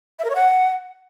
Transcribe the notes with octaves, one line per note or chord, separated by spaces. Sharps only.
E5
A#4
C#5
F#5